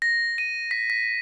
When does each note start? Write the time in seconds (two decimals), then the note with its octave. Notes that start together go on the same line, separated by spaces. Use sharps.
0.02 A#6
0.38 D#7
0.71 B6
0.90 B6